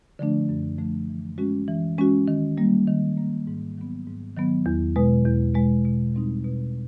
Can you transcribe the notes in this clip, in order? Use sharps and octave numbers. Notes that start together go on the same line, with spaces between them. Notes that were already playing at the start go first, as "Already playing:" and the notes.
D3 F3 A3 D4
F#2
D3 F3 A3 D4
E3
G#3 C#4 F#4
E3
G#3 C#4 F#4
D#3
G3 A#3
D#3
G3 A#3
G#2
D#3 F#3 B3
G#2
D#3 F#3 B3
E2
B2 G#3
E2
B2 G#3
B2
G3 C4 D#4
B2